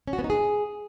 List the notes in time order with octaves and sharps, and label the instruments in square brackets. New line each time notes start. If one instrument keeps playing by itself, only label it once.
[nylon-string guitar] C#4
F#4
B3
D#4
G#4